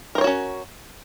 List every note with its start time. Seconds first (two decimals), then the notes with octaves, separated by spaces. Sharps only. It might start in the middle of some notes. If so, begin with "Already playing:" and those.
0.15 A#4
0.18 C5
0.21 C#5
0.24 F#4
0.27 C#4